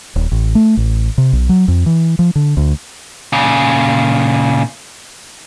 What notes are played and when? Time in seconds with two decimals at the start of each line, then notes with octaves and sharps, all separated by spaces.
0.16 D#1
0.32 A1
0.55 A3
0.77 A1
1.18 C3
1.33 B1
1.49 F#3
1.68 F2
1.86 E3
2.19 F3
2.35 D3
2.57 D2
3.33 A#2 C#3